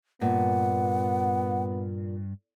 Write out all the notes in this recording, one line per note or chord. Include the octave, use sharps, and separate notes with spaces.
G2 A#2 B3 F#5